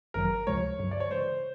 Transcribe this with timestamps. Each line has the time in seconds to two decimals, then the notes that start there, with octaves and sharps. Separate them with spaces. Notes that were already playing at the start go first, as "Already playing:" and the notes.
0.14 G#1 F#2 D#3 F#3 A#4
0.47 C#2 C3 F3 G#3 C#5
0.79 G2 D3 F#3
0.91 D5
1.00 C#5
1.10 C#3 E3 G#3 C5